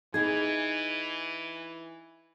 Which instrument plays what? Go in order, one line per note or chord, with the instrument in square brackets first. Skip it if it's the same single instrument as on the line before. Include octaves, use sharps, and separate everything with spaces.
[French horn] E3 [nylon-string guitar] D#4 G#4 [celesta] G#6